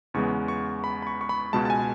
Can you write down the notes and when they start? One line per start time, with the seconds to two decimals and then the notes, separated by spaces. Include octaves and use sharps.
0.14 E2 C#3 G#3 B3 C#6
0.48 C#6
0.84 B5
1.02 B5
1.07 C#6
1.21 C#6
1.29 B5
1.53 C#2 B2 G#3 A5
1.65 A5
1.70 G#5